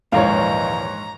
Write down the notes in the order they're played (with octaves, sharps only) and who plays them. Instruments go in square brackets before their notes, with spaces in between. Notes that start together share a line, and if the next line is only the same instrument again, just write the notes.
[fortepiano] A#1 D#2 E3 [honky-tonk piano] G#2 C#5 [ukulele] F5 [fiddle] A#5